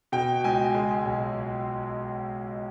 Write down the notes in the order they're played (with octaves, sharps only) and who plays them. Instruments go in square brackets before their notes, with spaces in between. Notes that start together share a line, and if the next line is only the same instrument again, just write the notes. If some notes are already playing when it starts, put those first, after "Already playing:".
[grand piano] B2 G5
C#2 G#5
G#3
B1